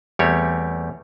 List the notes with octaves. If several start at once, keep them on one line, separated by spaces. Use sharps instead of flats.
E2 G3 A3 C4 G4 C#5